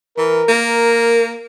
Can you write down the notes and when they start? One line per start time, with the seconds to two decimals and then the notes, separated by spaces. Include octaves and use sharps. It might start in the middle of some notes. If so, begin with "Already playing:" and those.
0.18 E3 A#4
0.48 A#3